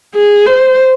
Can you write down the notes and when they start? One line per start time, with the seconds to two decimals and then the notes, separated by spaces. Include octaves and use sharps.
0.15 G#4
0.46 C5